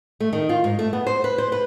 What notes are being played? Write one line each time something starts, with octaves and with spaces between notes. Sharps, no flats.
A3
D#3
F4
G#2
A3
B3
C5
B4
C5
B4